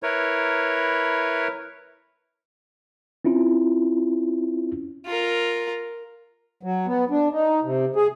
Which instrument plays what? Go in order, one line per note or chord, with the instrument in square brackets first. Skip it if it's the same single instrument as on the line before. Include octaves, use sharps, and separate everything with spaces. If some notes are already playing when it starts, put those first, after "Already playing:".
[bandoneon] E4 A#4 B4 C#5
[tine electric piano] C4 C#4 E4 F4
[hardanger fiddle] F4 A#4
[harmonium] F#3
B3
D4
D#4
C3
G#4